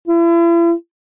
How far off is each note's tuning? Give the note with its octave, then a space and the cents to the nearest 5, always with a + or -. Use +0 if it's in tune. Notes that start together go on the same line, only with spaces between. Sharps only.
E4 +40